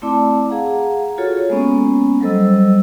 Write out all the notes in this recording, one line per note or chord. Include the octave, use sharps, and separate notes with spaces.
A3 C4 E4 D5 A5 D6
G#4 F5 F#5 A#5
F4 F#4 G#4 A4 C#5
G#3 A#3 B3 C#4
F#3 G3 A4 C5 D#5 E6